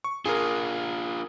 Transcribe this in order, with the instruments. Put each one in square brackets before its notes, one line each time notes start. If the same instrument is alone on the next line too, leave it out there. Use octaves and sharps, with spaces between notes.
[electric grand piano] C#6
[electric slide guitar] D4 F4 [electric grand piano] G#4 A#4